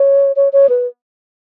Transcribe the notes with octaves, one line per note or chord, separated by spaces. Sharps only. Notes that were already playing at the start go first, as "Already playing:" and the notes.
Already playing: C#5
C#5
C#5
B4